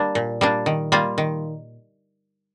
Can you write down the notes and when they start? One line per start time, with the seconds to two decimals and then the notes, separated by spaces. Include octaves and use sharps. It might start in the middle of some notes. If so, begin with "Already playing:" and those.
Already playing: G3 A#3 D4
0.15 A#2
0.41 G3 A#3 D4
0.66 D#3
0.92 G3 A#3 F4
1.18 D#3